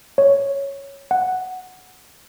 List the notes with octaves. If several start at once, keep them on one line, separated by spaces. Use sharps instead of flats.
C#5
F#5